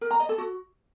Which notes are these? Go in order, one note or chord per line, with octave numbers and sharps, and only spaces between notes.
A#4
A#5
D#5
A4
F#4